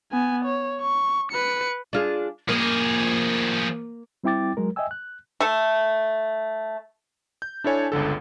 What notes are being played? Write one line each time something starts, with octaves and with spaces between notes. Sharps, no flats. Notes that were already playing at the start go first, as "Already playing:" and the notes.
B3 G#5
C#5
C#6
B4 C#7
D4 F4 G#4
F3 A#3 G#4
G3 C4 E4 G5 D6 A6
F#3 G#3 A#4
D#5 E5 G5 G#5 E6
F#6
A3 A4
G6
D4 E4 A4 C#5 G#5 A5
G1 C#2 D3 A4